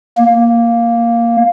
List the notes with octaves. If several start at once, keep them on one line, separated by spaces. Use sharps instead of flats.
A#3